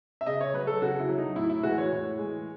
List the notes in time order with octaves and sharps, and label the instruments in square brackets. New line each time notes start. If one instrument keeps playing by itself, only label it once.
[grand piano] E5
C#3 D#5
C#5
F#3 B4
A4
C#3 F#4
E4
F#3
D#4
A2 E4
E4
E3 G#3 F#4
C#5
A2
E3 G#3